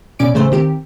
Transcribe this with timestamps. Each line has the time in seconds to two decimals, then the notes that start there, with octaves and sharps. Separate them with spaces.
0.19 B2 C#4 D5 D7
0.34 A1 C#3 A3 C5
0.52 D#3 C4 G4